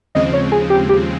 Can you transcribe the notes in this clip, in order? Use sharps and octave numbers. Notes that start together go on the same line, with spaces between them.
D#2 C#3 F3 G#3 C4 D#5
C#5
G#4
G4
G4